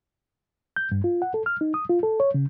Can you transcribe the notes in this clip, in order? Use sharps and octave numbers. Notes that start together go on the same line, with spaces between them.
G6
G2
F4
F#5
A4
F6
D#4
D#6
F4
A4
C#5
C#3